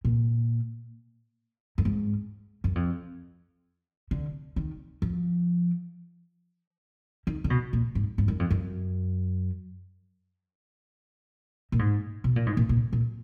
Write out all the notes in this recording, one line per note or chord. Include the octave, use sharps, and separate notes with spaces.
A#2
F#2
G#2
F#2
F2
D3
D#3
F3
D#3
D3
B2
A#2
G#2
G#2
F#2
F2
F#2
A#2
G#2
B2
A#2
G#2
A#2
A#2
A#2